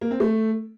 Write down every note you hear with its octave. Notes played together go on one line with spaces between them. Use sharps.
A#3
C4
A3